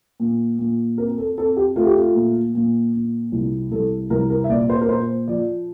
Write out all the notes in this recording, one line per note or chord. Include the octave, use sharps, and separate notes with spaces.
A#2
A#2
C4 A#4
A4
C4 A4
G4
A3 F4
G4
F4
A#2
A#2
A#2
C2
C2 A4
C2 A#4
A#4
E5
A#2 D5
C5
A#4
A#2 C5
F3 D5